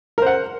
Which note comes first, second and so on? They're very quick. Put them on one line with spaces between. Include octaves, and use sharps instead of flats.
A#4 C5 F#5